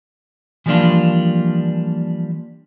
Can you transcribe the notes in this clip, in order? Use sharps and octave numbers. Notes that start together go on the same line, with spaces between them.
E3 F3 G3 A#3 D4 F4